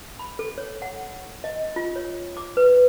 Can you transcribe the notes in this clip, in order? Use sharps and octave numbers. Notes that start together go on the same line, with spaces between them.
B5
A4
C#5
F#5
D#5
F4
C#5
D6
B4